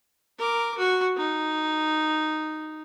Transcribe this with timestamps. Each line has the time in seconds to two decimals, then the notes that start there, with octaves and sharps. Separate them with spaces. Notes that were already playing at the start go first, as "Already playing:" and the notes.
0.38 A#4 D6
0.78 F#4 C#6
1.17 D#4